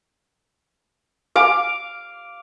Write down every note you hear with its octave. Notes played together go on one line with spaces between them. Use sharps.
F5 D6